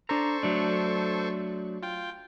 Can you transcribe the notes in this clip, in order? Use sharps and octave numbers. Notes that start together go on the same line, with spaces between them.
D4 A4 C5 A#5 C#6
F#3 A3 D4
F4 G5